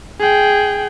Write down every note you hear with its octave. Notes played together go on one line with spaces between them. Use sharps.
G#4 G5